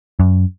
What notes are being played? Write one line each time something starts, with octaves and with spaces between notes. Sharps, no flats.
F#2